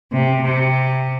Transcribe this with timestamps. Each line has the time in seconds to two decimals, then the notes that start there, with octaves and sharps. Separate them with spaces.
0.12 C3
0.43 C3